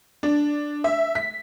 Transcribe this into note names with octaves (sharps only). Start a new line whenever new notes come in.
D4
E5
B6